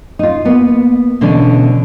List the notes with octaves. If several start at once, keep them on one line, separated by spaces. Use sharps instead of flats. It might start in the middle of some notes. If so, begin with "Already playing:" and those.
D#4 F4
A#3 B3
B2 D3 E3 C#4 D4